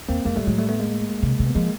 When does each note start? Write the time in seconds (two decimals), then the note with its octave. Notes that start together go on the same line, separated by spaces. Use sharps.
0.09 E2 A#3 C4
0.25 F2 G#3 A#3
0.36 G#2 G3 A3
0.47 A2 F#3 G#3
0.58 G3 A3
0.69 A3 B3
0.80 G#3 A#3
1.23 C3
1.40 C3
1.46 B3
1.55 F3 G#3 A#3